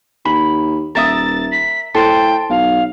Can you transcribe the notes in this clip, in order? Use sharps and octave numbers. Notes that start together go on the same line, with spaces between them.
D#2 B5
D#1 A#4 E5 D#6 A6
B6
A2 A4 C5 G5 A5
B1 F5